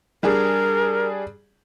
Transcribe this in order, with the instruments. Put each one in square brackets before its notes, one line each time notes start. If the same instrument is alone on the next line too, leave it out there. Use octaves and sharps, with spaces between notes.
[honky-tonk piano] G3 D4 G#4 [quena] A#4